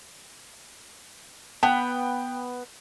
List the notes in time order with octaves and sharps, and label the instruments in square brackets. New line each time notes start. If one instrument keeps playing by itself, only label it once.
[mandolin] B3 [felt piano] G5